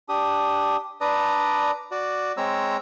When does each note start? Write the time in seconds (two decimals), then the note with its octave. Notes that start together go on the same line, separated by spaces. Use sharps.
0.09 D4 G4 D#6
1.01 D4 B4 D5 A#5 D#6
1.91 F#4 D5
2.37 G#3 C4 C#5 A#5 E6